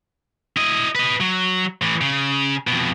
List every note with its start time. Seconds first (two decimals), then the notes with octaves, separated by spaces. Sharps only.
0.57 E4 D#5
0.95 B4 D#5
1.20 F#3
1.82 A2 E3
2.01 C#3
2.67 F2 B2